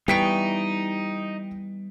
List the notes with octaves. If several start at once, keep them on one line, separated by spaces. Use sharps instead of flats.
E3 G3 B3 D#4 G5 C#6 B6 D7